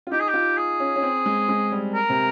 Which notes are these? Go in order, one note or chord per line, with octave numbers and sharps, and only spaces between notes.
F4
D#4 G4
G#4
G4
F4
G#4
C#4
C#4
C4
G#3
G#3
G3
A#4
C3